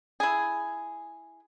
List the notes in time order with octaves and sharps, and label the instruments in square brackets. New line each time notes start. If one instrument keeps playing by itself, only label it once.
[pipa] E4 G#4